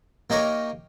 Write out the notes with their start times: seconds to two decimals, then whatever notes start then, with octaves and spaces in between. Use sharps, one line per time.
0.30 A#3 D#4 G4 A#4 C#5